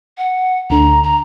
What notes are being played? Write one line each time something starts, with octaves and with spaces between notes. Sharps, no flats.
F#5
D2 D3 A#5
A#5